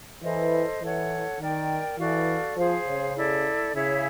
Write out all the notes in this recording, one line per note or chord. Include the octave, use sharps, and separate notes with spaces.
E3 A4 C5 D#5
E3 A4 C#5 F#5
D#3 A#4 D5 G5
E3 F#4 A4 D5 F5
F3 G#4 C5 F5
C#3
E4 A4 D5
C#3 E4 G#4 C#5 E5